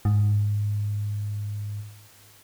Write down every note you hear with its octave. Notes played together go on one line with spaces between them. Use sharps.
G#2